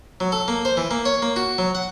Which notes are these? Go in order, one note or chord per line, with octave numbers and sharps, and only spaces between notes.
F#3
A4
A#3
C5
E3
A#3
C#5
A#3
F#4
F#3
F#5